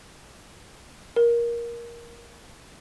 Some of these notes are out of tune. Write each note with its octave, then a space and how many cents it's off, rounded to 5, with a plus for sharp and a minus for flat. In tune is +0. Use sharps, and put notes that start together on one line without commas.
A#4 +15